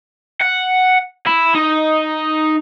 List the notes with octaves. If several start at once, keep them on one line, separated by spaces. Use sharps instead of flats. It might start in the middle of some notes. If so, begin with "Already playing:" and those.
F#5
E4
D#4